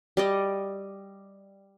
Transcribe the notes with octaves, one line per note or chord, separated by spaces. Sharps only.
G3 D5 D#5